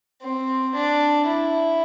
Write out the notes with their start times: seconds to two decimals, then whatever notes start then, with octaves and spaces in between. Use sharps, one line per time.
0.22 C4
0.75 D4
1.27 E4